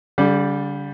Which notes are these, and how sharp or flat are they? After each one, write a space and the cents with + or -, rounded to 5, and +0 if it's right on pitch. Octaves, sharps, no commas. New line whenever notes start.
D3 -45 G3 +0 D5 +0